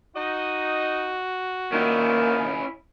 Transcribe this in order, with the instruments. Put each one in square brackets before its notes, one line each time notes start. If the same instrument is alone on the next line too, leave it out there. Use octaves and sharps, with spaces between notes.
[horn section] D#4 D#5 [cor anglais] F#4
[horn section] A#2 D#3 [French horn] A#3 [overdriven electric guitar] C#4 E4